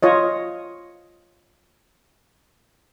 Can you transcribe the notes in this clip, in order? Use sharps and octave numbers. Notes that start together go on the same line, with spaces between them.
F4 C#5 D#5